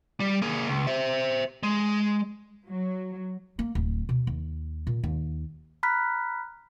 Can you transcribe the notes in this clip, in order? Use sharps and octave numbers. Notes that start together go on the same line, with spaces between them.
G3
A#3 G#4
C#2
C5 E5
G#3
F#3
A#3
D1
B2
D#2
A#2
D#2
A#5 B5 F6 F#6 B6